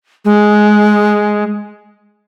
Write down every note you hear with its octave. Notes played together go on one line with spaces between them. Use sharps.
G#3